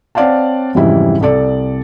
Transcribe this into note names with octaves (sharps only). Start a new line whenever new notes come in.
C4 C#5 D5 F5 F#5 A5
F2 G#2 C#3 E3 G3 E4
C2 A4 D5